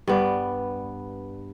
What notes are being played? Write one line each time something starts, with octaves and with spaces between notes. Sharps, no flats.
G2 B3 D5